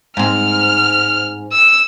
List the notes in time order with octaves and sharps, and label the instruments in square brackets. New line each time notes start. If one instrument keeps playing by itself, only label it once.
[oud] G#2 C4 [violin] F6
[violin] E6